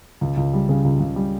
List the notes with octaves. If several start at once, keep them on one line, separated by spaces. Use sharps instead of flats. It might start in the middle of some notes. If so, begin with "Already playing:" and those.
C#2
C#2
G3
C#3
C#2
C#2
G3